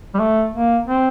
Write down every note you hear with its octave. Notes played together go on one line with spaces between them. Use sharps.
G3
A3
A#3
C4